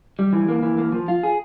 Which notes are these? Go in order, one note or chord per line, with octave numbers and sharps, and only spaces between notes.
G3
E3
A#3
E3
A#3
F3
F4
G#4